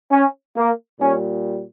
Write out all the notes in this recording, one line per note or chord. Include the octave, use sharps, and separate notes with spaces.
C#4
A#3
A#2 G3 C#4